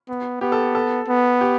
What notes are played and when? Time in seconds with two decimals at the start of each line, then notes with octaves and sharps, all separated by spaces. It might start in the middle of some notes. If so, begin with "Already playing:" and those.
0.09 B3
0.41 B3 G4
0.52 A4
0.75 A4
1.08 B3
1.41 G4